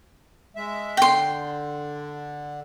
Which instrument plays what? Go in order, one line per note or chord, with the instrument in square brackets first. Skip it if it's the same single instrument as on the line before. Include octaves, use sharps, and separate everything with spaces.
[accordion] G#3 E5
[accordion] D3 [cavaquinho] G5 C6